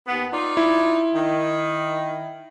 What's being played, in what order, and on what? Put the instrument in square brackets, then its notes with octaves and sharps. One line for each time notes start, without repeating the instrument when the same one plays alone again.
[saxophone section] D#2 B3
D#4 F4 D5
[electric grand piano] E4
[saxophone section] D#3